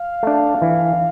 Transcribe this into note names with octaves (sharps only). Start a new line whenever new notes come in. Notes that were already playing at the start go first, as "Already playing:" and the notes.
Already playing: F5
A3 D4
E3